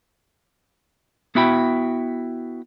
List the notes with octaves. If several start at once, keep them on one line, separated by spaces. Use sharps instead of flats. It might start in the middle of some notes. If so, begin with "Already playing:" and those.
B3 E4 F#4 E5 G5 B5